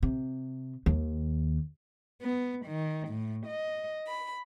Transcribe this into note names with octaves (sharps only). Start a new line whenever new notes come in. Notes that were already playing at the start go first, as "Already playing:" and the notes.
C3
D#2
B3
D#3
A2
D#5
B5